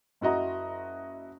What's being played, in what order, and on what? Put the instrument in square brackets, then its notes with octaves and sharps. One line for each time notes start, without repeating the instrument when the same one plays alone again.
[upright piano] F#1 E4 F#4 D#5 A#5